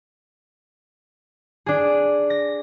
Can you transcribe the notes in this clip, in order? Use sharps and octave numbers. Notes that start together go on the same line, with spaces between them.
D4 G#4
A#6